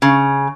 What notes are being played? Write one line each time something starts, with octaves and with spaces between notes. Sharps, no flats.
C#3